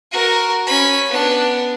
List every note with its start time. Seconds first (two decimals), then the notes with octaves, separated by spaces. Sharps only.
0.12 F#4 A#4
0.67 C#4 B5
1.09 B3 D4